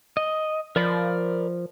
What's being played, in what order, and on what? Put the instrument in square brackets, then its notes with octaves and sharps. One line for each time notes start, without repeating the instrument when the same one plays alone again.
[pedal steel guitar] D#5
[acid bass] F3 [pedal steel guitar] A#4 D5 B5